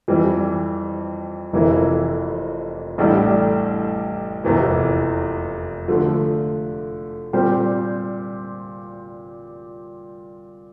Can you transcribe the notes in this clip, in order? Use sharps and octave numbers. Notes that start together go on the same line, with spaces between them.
F2 E3 G3
F1 F2 E3 A#3 E4
A1 A2 G3 D4
F1 E2 E3 A#3
D3 F3 A3
A#2 G3 C4 G4 C5